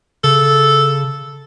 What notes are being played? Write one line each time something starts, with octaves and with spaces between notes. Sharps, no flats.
C#3 A4